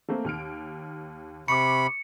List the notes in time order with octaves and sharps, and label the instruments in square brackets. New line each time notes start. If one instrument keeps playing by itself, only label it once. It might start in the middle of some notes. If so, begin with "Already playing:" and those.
[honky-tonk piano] A3 A#3 C4
D#2 F6 D7
[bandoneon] C3 B5 [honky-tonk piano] C#6 D6 [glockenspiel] C#7